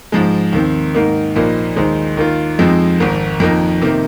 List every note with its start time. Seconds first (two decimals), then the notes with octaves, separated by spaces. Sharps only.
0.12 G#2 F3 G#3
0.52 D#2 D#3 C4
0.94 G#2 D#3 A#3 D#4
1.36 A#1 A#2 A#3 D#4
1.76 D#2 D#3 G#3 D#4 C5
2.17 D#2 D#3 A#3 F4
2.59 F2 F3 G#3 C4 D#4
3.00 G#1 G#2 D#3
3.40 F2 D#3 A#3 D#4
3.81 C3 D#3 A#3